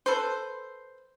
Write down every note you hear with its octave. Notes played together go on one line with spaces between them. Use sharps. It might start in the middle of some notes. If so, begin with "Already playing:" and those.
A4 B4 C5